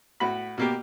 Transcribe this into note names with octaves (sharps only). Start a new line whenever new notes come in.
A2 F#4 B5
B2 A#3 G4